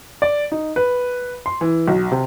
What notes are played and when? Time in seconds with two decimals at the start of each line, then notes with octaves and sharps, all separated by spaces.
0.22 D5
0.52 D#4
0.76 B4
1.46 C6
1.61 E3
1.88 B1
2.12 C3